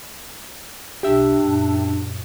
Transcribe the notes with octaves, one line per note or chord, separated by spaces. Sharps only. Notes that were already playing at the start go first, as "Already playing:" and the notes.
B1 D4 G4 E5
F#2 A#2